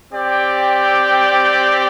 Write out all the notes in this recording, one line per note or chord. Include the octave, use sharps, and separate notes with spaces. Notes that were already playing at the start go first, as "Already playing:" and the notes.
C4 G4 D5 G5